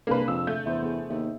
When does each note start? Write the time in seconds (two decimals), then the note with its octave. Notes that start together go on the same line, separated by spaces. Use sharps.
0.07 C2 C3 A#3 D4 G#4 B4
0.28 F2 E6
0.47 A3 G6
0.66 E2 C5 E5
0.83 B3 G#4
1.10 D#2 E5